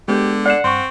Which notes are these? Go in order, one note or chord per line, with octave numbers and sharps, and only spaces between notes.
D3 G#3 B3 G4
D5 F#5 C7 E7
G2 C4 C6 C#6